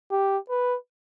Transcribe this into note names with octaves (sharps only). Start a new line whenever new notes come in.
G4
B4